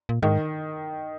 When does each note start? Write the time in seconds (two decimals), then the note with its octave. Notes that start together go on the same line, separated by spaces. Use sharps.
0.09 A#2
0.22 G#2 D#3